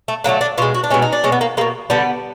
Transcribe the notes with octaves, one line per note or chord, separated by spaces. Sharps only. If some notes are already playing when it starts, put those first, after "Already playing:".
A3
D3 F#3 A3 A#3
D4
B2 G#3 F4
F#4
D4
B2 G#3 C#4
D#4
D4
B2 G#3 C#4
B3
A#3
B2 G#3 A#3
D3 G3 B3